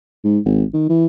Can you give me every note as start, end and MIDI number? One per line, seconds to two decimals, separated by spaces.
0.24 0.39 44
0.45 0.63 32
0.74 0.86 51
0.89 1.07 52